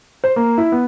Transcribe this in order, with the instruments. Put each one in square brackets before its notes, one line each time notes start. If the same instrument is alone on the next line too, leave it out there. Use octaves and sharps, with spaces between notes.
[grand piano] C5
A#3
E4
B3